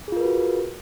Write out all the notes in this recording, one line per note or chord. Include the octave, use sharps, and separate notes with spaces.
F4 F#4 G#4 A#4 B4